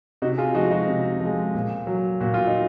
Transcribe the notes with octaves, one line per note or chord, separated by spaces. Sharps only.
C3 D#4 F#4
F4 G#4
F3 G#3 D#4 F#4
D#4 F#4
C3
F3 G#3
A#2
F#3
A#2 F#4
F4
D#4